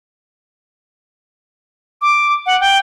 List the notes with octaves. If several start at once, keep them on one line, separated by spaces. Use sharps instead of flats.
D6
F#5
G5